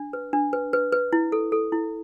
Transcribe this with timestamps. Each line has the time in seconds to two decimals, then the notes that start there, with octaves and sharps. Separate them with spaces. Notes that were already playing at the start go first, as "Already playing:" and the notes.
Already playing: D4
0.13 B4
0.33 D4
0.53 B4
0.73 B4
0.92 B4
1.13 E4
1.32 A4
1.52 A4
1.72 E4